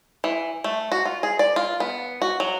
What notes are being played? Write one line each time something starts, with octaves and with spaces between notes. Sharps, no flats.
E3
A3
F#4
F4
G#4
D5
F4
B3
F#4
F#3